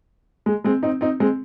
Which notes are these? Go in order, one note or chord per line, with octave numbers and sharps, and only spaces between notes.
G#3
G#3 C4
C4 D#4
C4 D#4
G#3 C4